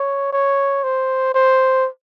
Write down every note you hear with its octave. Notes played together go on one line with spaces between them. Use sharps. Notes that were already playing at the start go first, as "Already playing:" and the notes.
Already playing: C#5
C#5
C5
C5